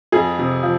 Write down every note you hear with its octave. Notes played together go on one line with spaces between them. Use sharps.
F2 G#4
C3
F3